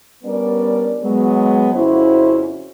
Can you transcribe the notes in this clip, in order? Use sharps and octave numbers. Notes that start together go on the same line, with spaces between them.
G3 B3 C#4 D4 A#4 D5
F#3 G#3 B3
F2 C#3 C#4 E4 F#4 C5